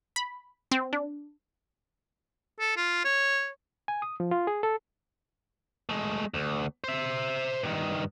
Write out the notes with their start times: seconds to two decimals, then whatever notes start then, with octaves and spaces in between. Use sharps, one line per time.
0.16 B5
0.71 C4
0.93 D4
2.60 A4
2.76 F4
3.05 C#5
3.88 G#5
4.02 D#6
4.20 F3
4.31 F4
4.47 G#4
4.63 A4
5.89 G#3 A3
6.34 D2
6.84 C5 E5
7.63 G2 D#3